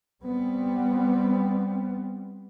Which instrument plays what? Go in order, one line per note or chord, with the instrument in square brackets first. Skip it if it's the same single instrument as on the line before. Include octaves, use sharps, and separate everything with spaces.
[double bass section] G3 B3 C4